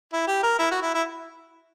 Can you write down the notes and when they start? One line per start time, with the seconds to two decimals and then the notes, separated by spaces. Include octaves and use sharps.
0.13 E4
0.27 G4
0.43 A#4
0.59 E4
0.71 F#4
0.82 E4
0.94 E4